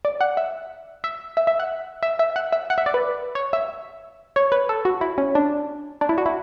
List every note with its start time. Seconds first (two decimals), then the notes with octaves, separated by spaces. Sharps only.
0.05 D5
0.21 F#5
0.37 E5
1.04 E5
1.37 E5
1.47 E5
1.60 F#5
2.03 E5
2.19 E5
2.36 F#5
2.52 E5
2.70 F#5
2.78 E5
2.86 D5
2.94 B4
3.35 C#5
3.53 E5
4.36 C#5
4.52 B4
4.69 A4
4.85 F#4
5.01 E4
5.18 C#4
5.35 D4
6.01 D4
6.09 E4
6.18 F#4
6.26 E4